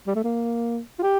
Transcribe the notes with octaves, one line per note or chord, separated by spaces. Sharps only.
G3
A3
A#3
F4
G4